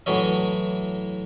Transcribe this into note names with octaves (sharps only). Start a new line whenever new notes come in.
A2 E3 F#3 C#5 D#5